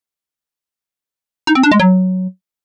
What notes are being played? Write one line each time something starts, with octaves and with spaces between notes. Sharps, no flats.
D#4
C4
D4
G#3
F#3